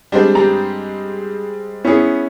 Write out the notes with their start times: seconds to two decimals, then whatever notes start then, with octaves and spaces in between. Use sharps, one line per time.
0.12 G3 G#3 C4 D4 C5
0.35 G2 G4 A#5
1.85 B3 C#4 E4 G#4